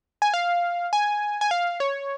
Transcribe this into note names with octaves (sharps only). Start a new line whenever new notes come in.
G#5
F5
G#5
G#5
F5
C#5